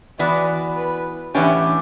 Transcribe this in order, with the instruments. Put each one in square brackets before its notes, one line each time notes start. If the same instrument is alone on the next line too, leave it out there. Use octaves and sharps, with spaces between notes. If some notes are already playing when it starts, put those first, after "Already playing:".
[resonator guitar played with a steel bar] E3 B3 F#4 [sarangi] D5
[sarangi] B4
[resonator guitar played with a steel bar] A2 E3 B3 D4 G4 [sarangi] C#4